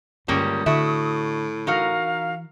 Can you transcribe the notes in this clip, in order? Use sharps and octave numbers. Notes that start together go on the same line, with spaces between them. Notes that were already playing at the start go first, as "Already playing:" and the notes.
C#2 G2 D3 G3 A#3 C#4 D#6
A2 D3 F#4 E5
E3 D#4 F#4 A#4 F5